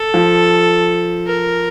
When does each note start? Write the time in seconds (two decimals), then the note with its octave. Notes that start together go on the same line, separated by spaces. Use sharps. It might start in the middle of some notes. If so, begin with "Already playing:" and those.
Already playing: A4
0.14 F3
1.27 A#4